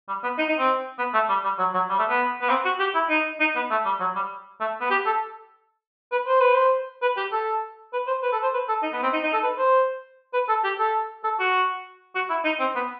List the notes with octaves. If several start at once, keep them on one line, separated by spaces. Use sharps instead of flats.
G3
B3
D#4
D#4
C4
B3
A3
G3
G3
F#3
F#3
G3
A3
B3
B3
C4
F#4
G4
E4
D#4
D#4
B3
A3
G3
F#3
G3
A3
B3
G4
A4
B4
C5
B4
C5
B4
G4
A4
B4
C5
B4
A4
C5
B4
A4
D#4
B3
C4
D#4
D#4
A4
B4
C5
B4
A4
G4
A4
A4
F#4
F#4
E4
D#4
C4
B3